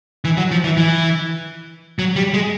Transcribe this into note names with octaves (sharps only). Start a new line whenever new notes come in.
E3
F#3
F3
E3
E3
F#3
G3
G#3